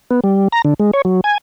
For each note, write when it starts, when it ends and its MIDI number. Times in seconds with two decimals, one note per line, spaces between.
0.11 0.20 59
0.24 0.48 55
0.52 0.62 82
0.65 0.74 50
0.80 0.91 56
0.93 1.02 73
1.05 1.21 54
1.24 1.38 80